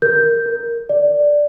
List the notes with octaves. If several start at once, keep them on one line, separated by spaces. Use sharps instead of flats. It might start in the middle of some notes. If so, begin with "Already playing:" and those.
A#4 G6
A#4
D5